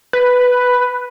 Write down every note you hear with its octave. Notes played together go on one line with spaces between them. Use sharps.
B4